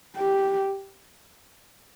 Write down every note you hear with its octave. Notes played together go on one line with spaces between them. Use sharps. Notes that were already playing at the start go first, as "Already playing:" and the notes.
G4